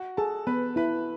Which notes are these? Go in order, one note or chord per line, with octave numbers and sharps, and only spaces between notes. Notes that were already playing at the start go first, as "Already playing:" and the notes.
Already playing: F#4 F#5
G#4 A4 A5
B3 B4 B5
E4 B4 B5